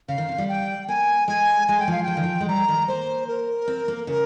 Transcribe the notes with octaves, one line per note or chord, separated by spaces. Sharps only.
C#3 F5
D#3
C3
G3
G5
A#3 G#5
G#3 G#5
G#3 G#5
G5
F3 F5
F3 G5
D#3
F3
G#3
G3 A#5
D#3
A#3 C5
A#4
C4
A#3
C#3 A#4